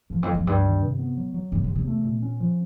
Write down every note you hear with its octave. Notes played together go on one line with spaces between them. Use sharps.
E2 F3
F2
F3
F#2
C#2 G2
D#3
C3
B3
F#3
F#3
F#2 C3
F2
C3
E2
A3
A#2
C#4
F3